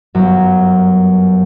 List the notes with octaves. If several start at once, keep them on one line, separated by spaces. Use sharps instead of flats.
G1 F#2